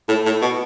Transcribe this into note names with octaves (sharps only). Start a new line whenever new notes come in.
A2
A2
B2